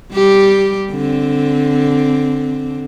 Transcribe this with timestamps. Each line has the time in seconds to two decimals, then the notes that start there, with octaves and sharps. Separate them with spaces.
0.13 G3 G4
0.92 D3 C4